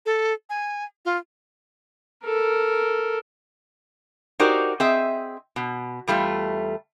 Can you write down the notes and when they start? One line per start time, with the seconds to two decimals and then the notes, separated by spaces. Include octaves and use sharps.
0.06 A4
0.50 G#5
1.05 F4
2.25 A4 A#4
4.39 D#4 F#4 G4 A#4 C5 D5
4.80 C4 G#4 D#5 E5
5.56 B2
6.08 E2 G3 A3 F4